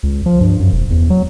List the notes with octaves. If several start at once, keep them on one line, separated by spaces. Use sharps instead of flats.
C#2
F3
G2
F#2
E1
E2
F#3